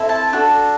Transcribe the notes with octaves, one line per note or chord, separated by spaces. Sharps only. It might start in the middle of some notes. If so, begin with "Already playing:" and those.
Already playing: C4 E4 A4
A5
D4 F#4 A4